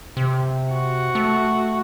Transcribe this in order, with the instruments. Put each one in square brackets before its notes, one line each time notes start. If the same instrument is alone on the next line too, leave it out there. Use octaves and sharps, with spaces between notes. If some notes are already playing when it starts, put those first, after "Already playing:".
[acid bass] C3
[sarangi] F#4
[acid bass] A3